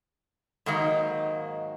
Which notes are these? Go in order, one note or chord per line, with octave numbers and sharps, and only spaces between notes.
G#2 D#3 F#3 A#3